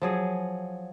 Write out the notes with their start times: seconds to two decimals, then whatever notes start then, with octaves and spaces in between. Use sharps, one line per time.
0.02 F3 F#3 G#4